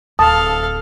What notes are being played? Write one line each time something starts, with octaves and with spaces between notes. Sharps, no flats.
D1 A4 F5 A5 D#6